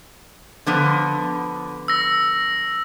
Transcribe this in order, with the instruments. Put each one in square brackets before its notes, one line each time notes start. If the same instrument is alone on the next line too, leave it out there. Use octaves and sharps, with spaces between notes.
[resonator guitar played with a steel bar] D3 F3 B3
[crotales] E6 A#6